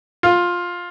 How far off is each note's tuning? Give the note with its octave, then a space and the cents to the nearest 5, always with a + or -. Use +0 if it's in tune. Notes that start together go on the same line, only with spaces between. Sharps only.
F4 +10